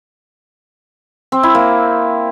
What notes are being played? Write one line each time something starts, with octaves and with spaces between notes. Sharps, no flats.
C4
E4
A#3